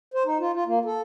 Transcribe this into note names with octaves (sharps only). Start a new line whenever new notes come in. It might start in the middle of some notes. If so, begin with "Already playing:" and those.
C5
D#4
F4
F4
A#3
A4